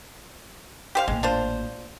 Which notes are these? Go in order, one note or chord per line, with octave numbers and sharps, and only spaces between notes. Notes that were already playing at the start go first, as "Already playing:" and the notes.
G4 C5 F5
A1 A#2 G#3
D4 F4 C5